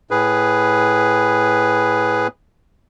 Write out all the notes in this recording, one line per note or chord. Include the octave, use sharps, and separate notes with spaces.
A2 G#4 B4